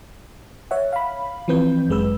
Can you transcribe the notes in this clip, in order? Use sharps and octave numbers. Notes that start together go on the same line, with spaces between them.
C#5 E5 F#5
F5 B5
E3 F3 C4 B4 G6
G1 F#2 G#3 B4 E6